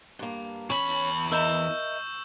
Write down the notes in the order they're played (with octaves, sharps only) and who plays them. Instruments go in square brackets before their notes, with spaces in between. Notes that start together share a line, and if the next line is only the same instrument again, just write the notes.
[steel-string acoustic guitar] G2 A#3
[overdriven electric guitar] E2 B5 [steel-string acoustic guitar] C#4 C#5 [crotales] C#6 F#7
[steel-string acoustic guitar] A#4 D#5 E5 [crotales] E6 G6 E7